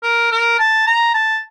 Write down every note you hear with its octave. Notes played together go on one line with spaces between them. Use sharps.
A#4
A#4
A5
A#5
A5